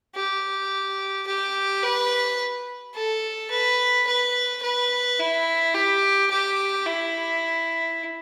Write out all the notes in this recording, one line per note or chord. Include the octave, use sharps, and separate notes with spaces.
G4
G4
B4
A4
B4
B4
B4
E4
G4
G4
E4